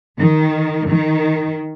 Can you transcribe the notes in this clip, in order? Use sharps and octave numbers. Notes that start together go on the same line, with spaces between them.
D#3
D#3